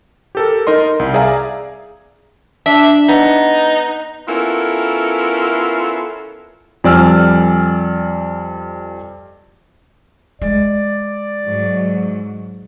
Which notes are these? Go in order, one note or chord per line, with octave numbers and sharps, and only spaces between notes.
G4 A4 A#4
D#4 A#4 D#5 C6
C2
G#4 D5 E5 F5 G#5 A#5
D4 E5
B3 D#4
B3 C#4 E4 F4 A4 A#4
F2 G3 D5 G#5 E6 F6
G#3 D5
G#2 F#3